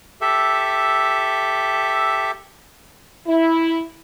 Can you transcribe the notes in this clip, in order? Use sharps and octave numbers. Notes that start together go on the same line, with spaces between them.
G4 A4 E5
E4